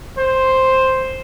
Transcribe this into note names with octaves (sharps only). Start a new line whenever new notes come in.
C5